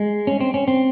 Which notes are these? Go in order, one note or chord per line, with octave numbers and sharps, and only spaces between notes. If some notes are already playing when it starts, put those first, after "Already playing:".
Already playing: G#3
C#4
C4
C#4
C4